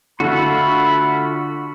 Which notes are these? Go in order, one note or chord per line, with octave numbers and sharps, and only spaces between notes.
D3 A3 F4 F#4 B5